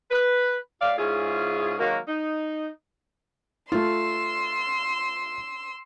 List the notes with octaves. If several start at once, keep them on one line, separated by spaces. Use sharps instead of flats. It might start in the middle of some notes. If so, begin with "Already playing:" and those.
B4
A2 D5 F5
G#2 C#4 E4 F4 G#4
D#3 F#3 G#3 A#3 F#4 A#4
D#4
A3 F4 C6 E6